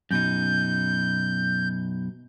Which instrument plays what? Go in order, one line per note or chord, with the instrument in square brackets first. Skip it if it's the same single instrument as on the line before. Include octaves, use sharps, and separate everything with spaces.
[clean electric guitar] F#2 B2 D#4 [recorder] G6